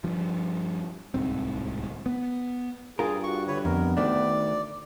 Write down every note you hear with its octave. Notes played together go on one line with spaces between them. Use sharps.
G2 F3
D1 C2 G#2 C4
B3
G2 F4 G#4 A#4
F#4 C#6
D3 B4 C#5
F2 B3 A#4
D2 D#3 A3 D4 D5